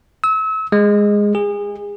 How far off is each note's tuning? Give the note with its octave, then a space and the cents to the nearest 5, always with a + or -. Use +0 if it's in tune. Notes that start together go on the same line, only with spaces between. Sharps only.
E6 -35
G#3 -10
G#4 -30